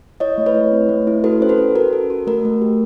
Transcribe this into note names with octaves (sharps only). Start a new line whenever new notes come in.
E4 C#5 D#5
A3
B4 C#5
E4
C4
A3
E4
F#4 A4 B4
C#4 C5
A4 B4
C#4
F#4 A#4
A4
F#4
A3 A#4
A3
G4